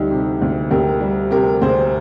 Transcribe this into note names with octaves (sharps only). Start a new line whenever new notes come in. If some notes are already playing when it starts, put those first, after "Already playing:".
Already playing: D2 G3 D#4 G4
C3
D2
D2 G4 A#4
G3
C3 G4 A#4
D2 G#4 C5